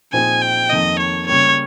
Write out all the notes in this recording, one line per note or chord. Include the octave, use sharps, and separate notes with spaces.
A#2 F3 C4 D#4 G#4 G#5
G5
F2 D#3 A#3 D#5
C#5
C#3 G3 A#3 C#5